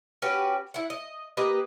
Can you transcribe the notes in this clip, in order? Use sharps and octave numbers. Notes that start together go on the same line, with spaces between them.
C#4 F#4 G4 B4
E4 F#5
D#5
A#3 G4 B4 D#5